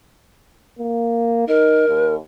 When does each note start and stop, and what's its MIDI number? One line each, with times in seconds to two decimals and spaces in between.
0.79 1.46 58
1.48 1.86 63
1.48 2.14 70
1.89 2.18 39